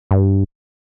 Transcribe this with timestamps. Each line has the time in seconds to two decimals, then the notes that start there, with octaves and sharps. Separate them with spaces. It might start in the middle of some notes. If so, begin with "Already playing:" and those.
0.11 G2